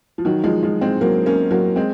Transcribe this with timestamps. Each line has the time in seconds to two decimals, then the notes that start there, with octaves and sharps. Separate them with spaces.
0.18 F3
0.25 D#3 F#3
0.44 F3 G#3
0.63 F3 G#3
0.81 G#3 C4
1.01 F#3 A#3
1.26 A#3 C#4
1.51 F#3 A#3
1.76 G#3 C4